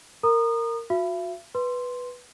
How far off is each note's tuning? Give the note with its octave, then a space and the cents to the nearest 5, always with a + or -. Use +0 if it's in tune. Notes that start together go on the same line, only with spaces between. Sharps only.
A#4 -15 A#5 +0 D#6 -30
F#4 -35 E5 +45
B4 +0 C6 +0